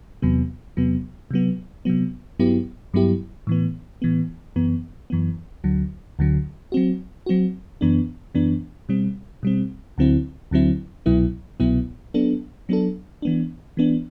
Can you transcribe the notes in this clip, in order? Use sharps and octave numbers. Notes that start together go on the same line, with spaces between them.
E2 C3 F#3 B3
E2 C3 F#3 B3
C3 F#3 B3
C3 F#3 B3
G2 F#3 B3 E4 G4
G2 F#3 B3 E4 G4
A2 E3 B3
A2 E3 B3
F#2 E3 B3
F#2 E3 B3
D2 D3 F#3
D2 D3 F#3
F#3 C4 F#4
F#3 C4 F#4
F#2 E3 B3 D4
F#2 E3 B3 D4
B2 G3 C4
B2 G3 C4
D2 D3 F#3 C4 E4
D2 D3 F#3 C4 E4
C2 B2 F#3 B3 E4
C2 B2 F#3 B3 E4
F#3 B3 D4 A4
F#3 B3 D4 A4
E3 B3 D4
E3 B3 D4